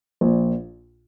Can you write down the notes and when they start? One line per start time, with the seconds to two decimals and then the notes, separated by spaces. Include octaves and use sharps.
0.21 A#1 A#2